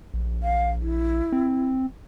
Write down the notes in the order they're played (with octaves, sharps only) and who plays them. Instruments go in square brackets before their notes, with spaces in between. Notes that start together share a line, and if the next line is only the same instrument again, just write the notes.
[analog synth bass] A#1
[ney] F5
E4
[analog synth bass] C4